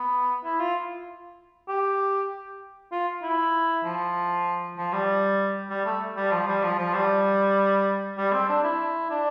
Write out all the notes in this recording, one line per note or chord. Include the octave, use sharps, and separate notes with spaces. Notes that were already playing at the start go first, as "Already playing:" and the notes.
Already playing: B3
E4
F4
G4
F4
E4
F3
F3
G3
G3
A3
G3
F3
G3
F3
F3
G3
G3
C4
D4
E4
D4